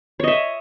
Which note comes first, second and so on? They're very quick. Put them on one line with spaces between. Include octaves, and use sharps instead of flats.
C#5 D#5 E5